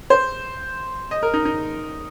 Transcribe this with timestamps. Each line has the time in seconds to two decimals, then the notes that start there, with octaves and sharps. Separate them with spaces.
0.10 C5
1.11 D#5
1.23 A#4
1.34 D#4
1.45 D#4